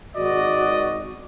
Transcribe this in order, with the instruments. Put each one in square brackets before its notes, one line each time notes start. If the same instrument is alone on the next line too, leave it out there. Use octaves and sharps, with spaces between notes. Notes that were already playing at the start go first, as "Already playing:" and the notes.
[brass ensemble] G#1 D#5 [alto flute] F#4 [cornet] D5